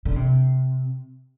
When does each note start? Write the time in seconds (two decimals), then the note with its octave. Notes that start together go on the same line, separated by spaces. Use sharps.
0.05 D3
0.16 C3